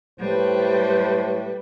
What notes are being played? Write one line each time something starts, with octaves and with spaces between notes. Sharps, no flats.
A2 G3 B4 C5